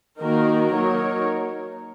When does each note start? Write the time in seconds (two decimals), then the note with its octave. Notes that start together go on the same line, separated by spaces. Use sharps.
0.21 D#3 A#3 D#4 F#4 A#4
0.73 F#3 A#3 D#4 A#4 C#5